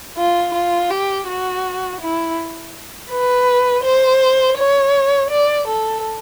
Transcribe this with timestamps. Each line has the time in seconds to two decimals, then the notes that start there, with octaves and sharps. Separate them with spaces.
0.17 F4
0.54 F4
0.90 G4
1.27 F#4
2.01 E4
3.10 B4
3.84 C5
4.57 C#5
5.30 D5
5.67 A4